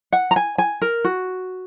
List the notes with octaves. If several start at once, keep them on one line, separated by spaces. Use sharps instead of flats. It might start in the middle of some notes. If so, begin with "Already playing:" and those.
F#5
A#5
G#5
G#5
A#4
F#4